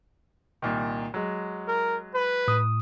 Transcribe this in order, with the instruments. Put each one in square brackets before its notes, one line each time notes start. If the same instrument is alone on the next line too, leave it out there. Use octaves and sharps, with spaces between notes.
[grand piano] C2 A#2 D#3
F#3 G#3
[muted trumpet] A#4
B4
[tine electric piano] A2 D#6